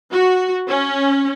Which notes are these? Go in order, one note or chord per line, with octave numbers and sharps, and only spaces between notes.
F#4
C#4